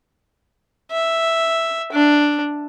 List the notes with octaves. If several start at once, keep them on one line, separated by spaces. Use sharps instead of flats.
E5
D4